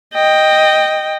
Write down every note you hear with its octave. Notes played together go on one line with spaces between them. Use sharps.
D#5 G5